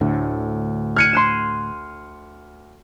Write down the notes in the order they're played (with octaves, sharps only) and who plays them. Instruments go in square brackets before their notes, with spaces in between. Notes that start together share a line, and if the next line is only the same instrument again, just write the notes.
[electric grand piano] D2 [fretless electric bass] A2 D3
[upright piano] F6 C#7 D#7 [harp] F#6 G#6
[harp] C6 F#6 E7